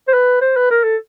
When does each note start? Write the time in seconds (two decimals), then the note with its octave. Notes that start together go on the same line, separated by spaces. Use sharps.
0.08 C5
0.14 B4
0.41 C5
0.56 B4
0.70 A#4
0.84 A4